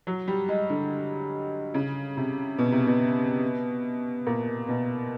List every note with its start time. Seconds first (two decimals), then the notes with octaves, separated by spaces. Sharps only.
0.07 F#3
0.28 G3
0.48 G#3
0.69 D3
1.74 C#3
2.17 C3
2.58 B2
2.72 C3
2.87 B2
4.27 A#2
4.68 B2